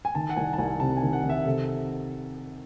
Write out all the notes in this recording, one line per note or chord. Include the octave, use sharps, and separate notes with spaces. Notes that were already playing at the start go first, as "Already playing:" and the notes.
G#5
D#3 A5
F#5
C2 G#5
A5
C2 G#5
C3 A5
G#5
D#3
F#5
D#3
E5
C3 A4